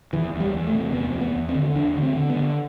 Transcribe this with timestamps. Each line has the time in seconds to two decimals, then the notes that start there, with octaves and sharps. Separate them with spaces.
0.13 E2 E3
0.33 E2
0.40 G3
0.54 E2
0.67 A3
0.74 C3
0.94 E2 B3
1.14 E2
1.21 B3
1.35 E2
1.49 C4
1.55 D3
1.75 E2 D4
1.96 D3
2.03 C4
2.16 D3
2.30 B3
2.36 D3